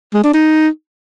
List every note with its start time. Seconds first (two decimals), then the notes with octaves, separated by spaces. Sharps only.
0.14 G#3
0.24 D4
0.34 D#4